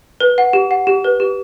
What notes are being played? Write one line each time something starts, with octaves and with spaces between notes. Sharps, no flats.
B4
F#5
G4
F#5
G4
B4
G4